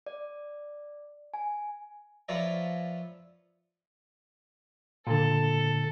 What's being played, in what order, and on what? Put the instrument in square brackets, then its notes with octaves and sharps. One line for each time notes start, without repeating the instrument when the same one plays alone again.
[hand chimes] D5
G#5
[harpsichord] F3 B4 C#5 D5 E5 A#5
[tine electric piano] A#2 D3 [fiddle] A4